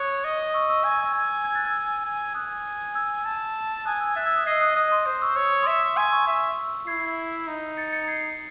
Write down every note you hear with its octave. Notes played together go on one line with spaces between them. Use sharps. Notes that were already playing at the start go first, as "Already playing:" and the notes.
Already playing: C#5 D#6 F#6
D#5
D#6
C#6 E6
C#6 E6
G#5 C#6 E6
E6 G#6
G#5
E6 G#6
F#6 A6
E6 G#6
G#5
G#5 D#6 F#6
E6 G#6
A5
G#5 D#6 F#6
E6 G#6
E5 F#6 A6
E6 G#6
D#6 F#6
D#5 G#6 C7
D#6 F#6
D#5 D#6 F#6
C6 D#6
C5 C6 D#6
C#6 E6
C#5 E6
D#6
C#6
E5 C6 D#6
G#5 C6 D#6
C#6 E6
E5
E4 G#6 C7
D#4
A6 C#7
A6 C#7
G#6 C7